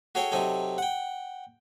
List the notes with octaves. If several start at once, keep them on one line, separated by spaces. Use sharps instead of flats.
F#4 G#4 A4 C#5 G5
C3 F#3 D#4 A4 G#5
F#5 G5